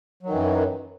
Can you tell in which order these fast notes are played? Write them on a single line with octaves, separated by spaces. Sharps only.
F#3 D#3 E3 F#2